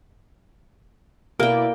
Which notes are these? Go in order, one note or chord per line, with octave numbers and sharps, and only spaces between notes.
B2 A#3 E4 A#4 D5 G5